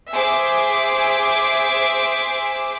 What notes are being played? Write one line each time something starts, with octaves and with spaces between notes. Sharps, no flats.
G#4 C5 E5 D6